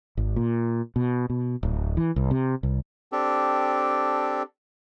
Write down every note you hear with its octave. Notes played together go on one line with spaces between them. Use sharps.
G#1
A#2
B2
B2
D1
E3
C2
C3
C2
C4 D4 G4 A4